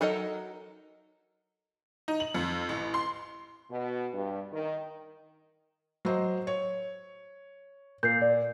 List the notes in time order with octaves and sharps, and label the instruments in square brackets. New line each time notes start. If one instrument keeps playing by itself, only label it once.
[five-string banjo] F#3 D#4 A4 A#4 D#5
[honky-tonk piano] D#4
F#7
F2
A1
C6
[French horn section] B2
G2
D#3
[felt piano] F#3 C5 D#5
C#5
[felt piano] A#2 [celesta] G6 C7
[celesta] D5